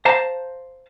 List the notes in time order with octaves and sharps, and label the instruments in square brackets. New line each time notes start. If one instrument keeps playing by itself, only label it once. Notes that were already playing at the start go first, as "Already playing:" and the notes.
[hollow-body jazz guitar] C5 F5 A5 A#5